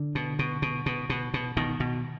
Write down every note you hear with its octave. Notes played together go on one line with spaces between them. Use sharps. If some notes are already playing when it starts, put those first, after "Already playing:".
Already playing: D3
B2
B2
B2
B2
B2
B2
B2 D#3
B2